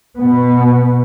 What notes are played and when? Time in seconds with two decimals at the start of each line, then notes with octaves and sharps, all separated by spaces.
0.19 B2 B3